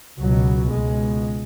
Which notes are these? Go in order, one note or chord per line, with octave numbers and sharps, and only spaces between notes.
C#2 B2 F#3
C#2 B2 G#3